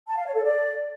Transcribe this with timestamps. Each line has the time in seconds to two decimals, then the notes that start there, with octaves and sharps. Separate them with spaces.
0.08 A5
0.17 F5
0.26 C#5
0.35 A4
0.44 D5